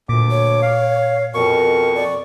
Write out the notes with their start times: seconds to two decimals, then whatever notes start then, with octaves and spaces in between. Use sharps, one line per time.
0.09 D2 A#2 D6
0.31 C#5
0.62 F5
1.34 F2 B2 A#4 C#6
1.96 D5